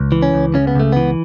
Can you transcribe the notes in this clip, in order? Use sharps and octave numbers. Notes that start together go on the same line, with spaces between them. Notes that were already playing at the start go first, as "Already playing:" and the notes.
Already playing: C#2
E3
C#4
C#2
C#3 C#4
B3
C#2 A3
E3 B3